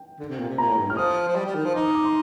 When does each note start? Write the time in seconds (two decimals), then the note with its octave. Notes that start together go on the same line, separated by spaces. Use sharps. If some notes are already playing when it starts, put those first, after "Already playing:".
Already playing: G5
0.19 D3
0.29 C3
0.39 A#2
0.49 C3
0.58 A#2 A#5
0.69 A2
0.78 G2
0.87 A2 F6
0.97 F3 D#6
1.27 F3
1.36 G3
1.46 G3
1.55 D#3
1.65 F3
1.74 D#4 D6
1.85 D#6
1.95 D6
2.05 C6